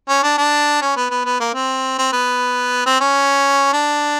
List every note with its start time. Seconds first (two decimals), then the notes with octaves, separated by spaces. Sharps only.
0.09 C#4
0.23 D4
0.37 D4
0.82 C#4
0.96 B3
1.10 B3
1.25 B3
1.40 A#3
1.54 C4
1.98 C4
2.12 B3
2.86 C4
3.01 C#4
3.73 D4